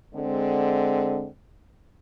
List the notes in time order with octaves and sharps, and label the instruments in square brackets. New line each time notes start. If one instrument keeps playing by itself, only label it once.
[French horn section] D3 G#3 C4